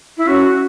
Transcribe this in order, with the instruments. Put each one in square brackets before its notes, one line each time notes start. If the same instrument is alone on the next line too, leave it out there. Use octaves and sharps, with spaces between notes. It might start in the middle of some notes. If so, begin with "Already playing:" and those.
[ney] E4
[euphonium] C#4 [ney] F#4